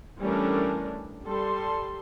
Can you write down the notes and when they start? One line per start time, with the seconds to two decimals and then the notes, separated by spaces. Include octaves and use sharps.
0.20 E3 G3 A3 C#4 D4 A#4
1.24 G3 A4 C6